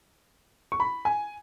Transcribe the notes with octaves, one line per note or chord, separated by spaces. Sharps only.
C#6
B5
G#5